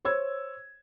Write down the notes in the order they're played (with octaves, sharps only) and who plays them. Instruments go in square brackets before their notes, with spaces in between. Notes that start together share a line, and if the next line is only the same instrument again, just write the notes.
[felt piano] C5 C#5 E6 G#6